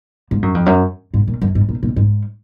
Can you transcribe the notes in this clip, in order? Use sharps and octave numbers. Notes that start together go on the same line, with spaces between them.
G#2
F#2
F2
F#2
G#2
A#2
F#2
G#2
A#2
A#2
G#2